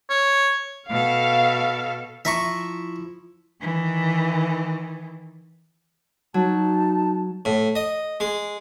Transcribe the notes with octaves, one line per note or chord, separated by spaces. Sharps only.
C#5
B2 A4 F5
F3 E4 E5 A#5 C#6
D#3 E3
F#3 D#4 A5
A2
D#5
G#3